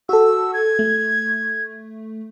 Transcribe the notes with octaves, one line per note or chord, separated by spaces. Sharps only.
F#4 A4 E6
G#6
A3